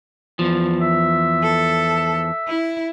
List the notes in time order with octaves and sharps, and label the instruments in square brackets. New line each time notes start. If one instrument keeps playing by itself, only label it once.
[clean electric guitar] E2 F3
[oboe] E5
[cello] A4
E4